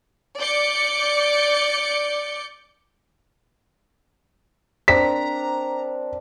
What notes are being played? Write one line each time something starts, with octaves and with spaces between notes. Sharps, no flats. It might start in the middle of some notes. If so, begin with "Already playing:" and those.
D5 D6 G6 C#7
C4 D4 A#4 A#5 B6